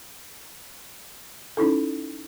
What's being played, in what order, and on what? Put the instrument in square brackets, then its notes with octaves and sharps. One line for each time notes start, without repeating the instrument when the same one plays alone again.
[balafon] C#4 D#4 E4 A4